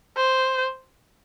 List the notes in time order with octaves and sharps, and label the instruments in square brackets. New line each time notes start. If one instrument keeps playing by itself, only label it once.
[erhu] C5